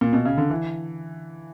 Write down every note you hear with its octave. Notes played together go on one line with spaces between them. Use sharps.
A#2
B2
C#3
D3
E3